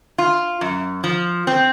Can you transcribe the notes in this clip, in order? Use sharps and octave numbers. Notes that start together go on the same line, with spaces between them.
F4
F#2
F3
C4